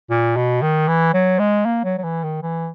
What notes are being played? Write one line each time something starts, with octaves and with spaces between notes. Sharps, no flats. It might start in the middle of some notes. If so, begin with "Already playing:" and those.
A#2
B2
D#3
E3
F#3
G#3
A#3
F#3
F#3
E3
D#3
E3